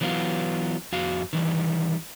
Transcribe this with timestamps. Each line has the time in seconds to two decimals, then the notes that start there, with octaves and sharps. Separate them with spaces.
0.01 E3 F#3 B3 E4 F4
0.92 F2 F#4 F5
1.33 D#3 E3 G3